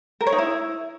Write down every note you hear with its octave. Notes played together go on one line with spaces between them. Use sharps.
A#4
C#5
D#4
E4